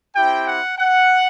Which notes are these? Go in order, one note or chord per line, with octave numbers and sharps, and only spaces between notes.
C4 E4 G4 G5
F#5
F#5